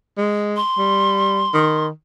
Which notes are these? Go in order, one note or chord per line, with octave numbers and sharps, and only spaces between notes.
G#3
C6
G3
D#3